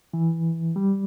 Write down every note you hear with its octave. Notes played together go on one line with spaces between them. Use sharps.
E3
G3